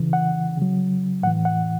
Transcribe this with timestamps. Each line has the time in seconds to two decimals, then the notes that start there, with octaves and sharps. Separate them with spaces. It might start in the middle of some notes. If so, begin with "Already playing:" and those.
Already playing: C#3 E3
0.13 F#5
0.57 C#3 F#3
1.23 A2 F#5
1.27 E3
1.45 F#5